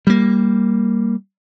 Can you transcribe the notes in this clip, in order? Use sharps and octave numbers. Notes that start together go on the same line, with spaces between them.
G3 A#3